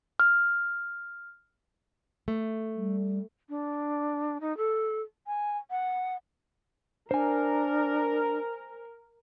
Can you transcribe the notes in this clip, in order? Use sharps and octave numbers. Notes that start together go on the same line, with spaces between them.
F6
A3
G3
D4
D#4
A4
G#5
F#5
D4 A#4 C5 G#5